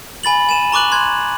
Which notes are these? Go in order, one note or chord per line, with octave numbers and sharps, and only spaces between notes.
G#5 B5 A6 F#7
G#5 D#7 E7
A#5 C#6 D6 F#6 F#7
C6 F#6 G#6